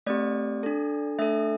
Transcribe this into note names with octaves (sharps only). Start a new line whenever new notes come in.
A3 C4 G4 D5
D4 A4
A3 D4 A4 E5